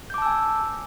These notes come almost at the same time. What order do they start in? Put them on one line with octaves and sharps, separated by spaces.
G6 D6 A5 E6 G#5